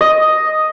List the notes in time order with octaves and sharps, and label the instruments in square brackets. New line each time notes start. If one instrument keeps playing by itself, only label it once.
[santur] D#5